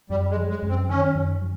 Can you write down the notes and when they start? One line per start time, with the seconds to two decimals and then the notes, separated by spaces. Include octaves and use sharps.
0.10 F#2 G3
0.30 G#3
0.36 F#3
0.49 G#3
0.62 F#2
0.69 C4
0.89 D#3 C#4
1.15 F#2
1.41 F#3